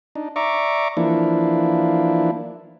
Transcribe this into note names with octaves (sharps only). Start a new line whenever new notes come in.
D4 D#4
D5 E5 A#5 C#6 D6
E3 F3 A#3 D4 E4